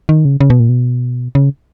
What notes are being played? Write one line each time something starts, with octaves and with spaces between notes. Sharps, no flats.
D#3
C#3
C#3
B2
A#2
B2
C#3